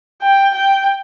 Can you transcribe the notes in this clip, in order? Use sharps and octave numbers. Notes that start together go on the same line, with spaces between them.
G5
G5